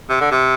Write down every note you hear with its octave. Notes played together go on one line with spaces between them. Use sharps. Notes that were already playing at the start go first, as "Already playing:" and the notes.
C3
D3
C3